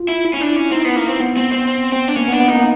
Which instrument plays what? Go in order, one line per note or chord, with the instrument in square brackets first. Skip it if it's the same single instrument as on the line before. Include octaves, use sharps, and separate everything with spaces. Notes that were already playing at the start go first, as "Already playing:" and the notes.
Already playing: [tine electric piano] F4
[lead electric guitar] E4
[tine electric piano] E4
[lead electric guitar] C#4
D4
C#4
[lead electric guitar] C4 [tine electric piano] D#4
[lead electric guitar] B3
A#3
C4
[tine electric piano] B3
[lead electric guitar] C4
C4
C4
C4
D4
[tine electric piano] A#3 [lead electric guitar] C#4
[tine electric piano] B3
[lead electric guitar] D4
[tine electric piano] B3
[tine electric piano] A#3 [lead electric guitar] D#4